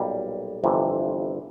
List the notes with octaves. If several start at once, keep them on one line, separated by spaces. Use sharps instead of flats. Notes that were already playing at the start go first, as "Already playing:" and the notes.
Already playing: B1 A#2 G3
G1 F2 C3 E3